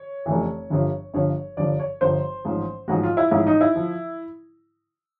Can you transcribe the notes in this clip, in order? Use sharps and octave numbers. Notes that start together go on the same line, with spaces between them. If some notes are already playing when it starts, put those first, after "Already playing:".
Already playing: C#5
F1 F2 C#3 E3
G1 G2 D3 F3
G1 G2 D3 F3 C#5
G1 G2 D3 F3 D5
C#5
G1 G2 D3 F3 C5
A1 G#2 F3
A1 G#2 F3 F#4
F4
E4
A1 G#2 F3 E4
D#4
E4
F3